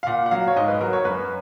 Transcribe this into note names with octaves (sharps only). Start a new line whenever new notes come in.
F5
A#2 F#5
F#5
F#3 F5
C#5
G#2 D#5
B4
F#3 A#4
C#5
F#2 B4